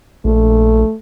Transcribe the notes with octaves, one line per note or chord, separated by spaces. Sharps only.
A#1 A3